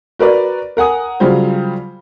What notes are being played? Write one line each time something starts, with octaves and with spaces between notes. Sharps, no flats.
F#4 A#4 B4 D5
A#4 F#5 G#5 D#6
C#3 F#3 G3 F4 C5